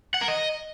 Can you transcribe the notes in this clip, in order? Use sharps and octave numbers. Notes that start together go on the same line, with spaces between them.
F#5
A#4
D#5